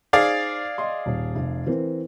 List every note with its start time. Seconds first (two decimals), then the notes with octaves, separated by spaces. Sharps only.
0.13 D#4 G#4 C5 D5 F5
0.78 D#5 C6
1.06 D#1
1.35 F1
1.66 E3 C4 A#4